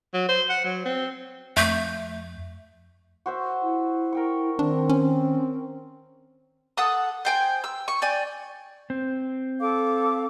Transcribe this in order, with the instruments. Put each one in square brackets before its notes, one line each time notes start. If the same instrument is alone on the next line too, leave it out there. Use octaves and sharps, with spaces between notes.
[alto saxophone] F#3
C5
F#5
F#3
C4
[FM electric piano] F2 [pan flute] A3 [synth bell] E5 G6
[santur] F#4 C5 E5
[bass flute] E4
[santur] A#4 G5 C#6
[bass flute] D#3 [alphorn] C4 [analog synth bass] D4
[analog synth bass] C#4
[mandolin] A4 F#5 D#6
C5 G5 G#5
E6
C#6
D5 G5 G#5
[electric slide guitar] C4
[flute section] A4 F5 D6